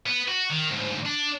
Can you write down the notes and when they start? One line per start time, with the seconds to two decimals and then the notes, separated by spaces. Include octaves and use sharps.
0.06 B3
0.28 F#4
0.51 D#3
0.71 D2 G#2
1.06 D4